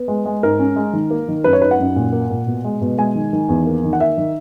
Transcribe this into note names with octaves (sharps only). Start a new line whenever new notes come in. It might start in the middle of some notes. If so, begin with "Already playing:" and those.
Already playing: B3
G#3
G#3
G#2 A#4
C#4
G#3
D#3
A#3
D#3
F#2 B4
C#5
D#4 B4
F#5
F#2
A#2
A#3
A#2
B2
G#3
B2
G#3 G#5
D#3
D#3
E2
A#3
D#3
F#5
A#3 E5
D#3